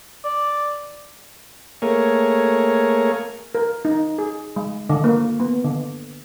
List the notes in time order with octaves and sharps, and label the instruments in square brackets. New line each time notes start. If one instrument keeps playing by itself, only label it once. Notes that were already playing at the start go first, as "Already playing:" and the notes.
[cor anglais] D5
[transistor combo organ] A3 A#3 G#4 A#4 C#5
[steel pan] A#4
D#4
G#4
G#3
D3
A#3
B3
D3